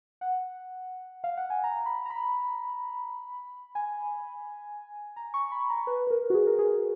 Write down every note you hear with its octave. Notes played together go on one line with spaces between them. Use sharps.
F#5
F5
F#5
G#5
A#5
B5
A#5
B5
G#5
A#5
C#6
B5
A#5
B4
B4
A#4
F#4
G#4
A#4
G#4